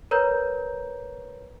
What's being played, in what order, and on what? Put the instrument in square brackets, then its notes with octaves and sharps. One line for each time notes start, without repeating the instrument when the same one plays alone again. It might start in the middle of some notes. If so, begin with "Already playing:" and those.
[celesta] A#4 B4 C#5 A#5 G6